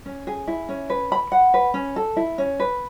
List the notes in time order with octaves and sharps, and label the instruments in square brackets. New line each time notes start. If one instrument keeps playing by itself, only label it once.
[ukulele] C#4
G#4
E4
C#4
B4
B5
F#5
B4
C#4
A4
E4
C#4
B4